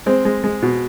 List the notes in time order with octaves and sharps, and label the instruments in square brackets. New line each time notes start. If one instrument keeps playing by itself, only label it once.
[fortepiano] G#3 C4
G#3
G#3
B2